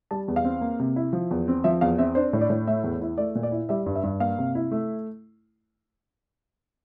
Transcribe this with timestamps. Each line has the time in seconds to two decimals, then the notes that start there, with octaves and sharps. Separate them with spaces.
0.11 G3 A5
0.28 E2
0.36 F5
0.44 C4
0.61 A#3
0.80 C3
0.96 E4
1.13 F3
1.31 E2
1.48 C4
1.64 F3 E5
1.81 E2 F5
1.98 C4 E5
2.15 D4 C5
2.33 A2
2.41 D5
2.50 A2
2.67 A3 E5
2.84 E2
3.01 E4
3.18 A3 D5
3.35 A#2
3.43 D5
3.52 E4
3.69 G3 E5
3.86 G2
3.95 E5
4.03 G2
4.20 A#3 F5
4.38 C3
4.55 E4
4.71 A3